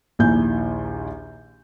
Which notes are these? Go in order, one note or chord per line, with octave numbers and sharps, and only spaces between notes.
A#1 D#2 A#2 E4 G#5 G6